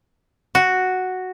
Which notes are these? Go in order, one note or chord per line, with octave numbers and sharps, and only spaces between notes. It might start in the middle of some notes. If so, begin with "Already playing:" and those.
F#4